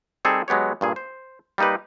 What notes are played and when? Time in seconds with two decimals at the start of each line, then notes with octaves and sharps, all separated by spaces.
0.25 G3 C4 D#4 G#4 A4
0.48 F#3 G#3 B3 G4 C#5
0.81 G2 A#2 G#4
0.96 C5
1.58 G3 A#3 D#4 G4 B4